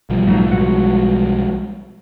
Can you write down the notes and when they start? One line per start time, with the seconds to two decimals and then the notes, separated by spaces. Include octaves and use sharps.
0.10 B1 F3 G3
0.27 A2 F#3 D#4
0.51 G#3 F#4 F#5